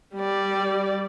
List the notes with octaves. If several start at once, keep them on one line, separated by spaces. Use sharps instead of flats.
G3 D5